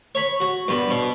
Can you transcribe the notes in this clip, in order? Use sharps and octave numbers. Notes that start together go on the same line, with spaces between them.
C#5 B5
F#4
G2 B3
B2